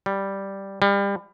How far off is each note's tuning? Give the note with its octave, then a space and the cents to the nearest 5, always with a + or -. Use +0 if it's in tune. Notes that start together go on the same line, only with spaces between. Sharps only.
G3 +0
G3 +30